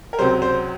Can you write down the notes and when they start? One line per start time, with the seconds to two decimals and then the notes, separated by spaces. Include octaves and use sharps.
0.13 A#4
0.19 C#2 C3 F#3 C5
0.42 C5